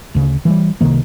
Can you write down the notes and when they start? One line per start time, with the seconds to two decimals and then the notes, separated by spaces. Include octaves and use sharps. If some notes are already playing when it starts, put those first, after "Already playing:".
0.15 D2 C#3
0.45 E3 F#3 G3
0.81 C2 C3 D#3 A#3